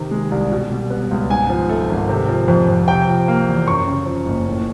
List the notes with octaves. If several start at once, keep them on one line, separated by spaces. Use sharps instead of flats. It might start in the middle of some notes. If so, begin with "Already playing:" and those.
Already playing: C3 D#3
G#3
C2
B2
G3
B3
C#2
G#2 G#5
F3
A3
G#1
C3
F3
F2
F2
C3 G5
F3
A#3
E2
F#2 C#6
C#3
F3
F#1
A2